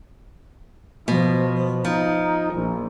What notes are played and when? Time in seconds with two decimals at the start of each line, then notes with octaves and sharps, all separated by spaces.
1.08 B2 F3
1.85 F3 D#4
2.54 A#1